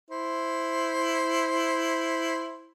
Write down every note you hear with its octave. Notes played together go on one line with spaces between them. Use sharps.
E4 C5